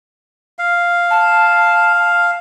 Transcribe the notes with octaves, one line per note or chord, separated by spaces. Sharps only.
F5
A5